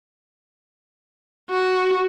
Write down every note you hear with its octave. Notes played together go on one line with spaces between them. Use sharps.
F#4